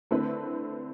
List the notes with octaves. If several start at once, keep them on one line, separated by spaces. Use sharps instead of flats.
D3 A3 C4 E4 B4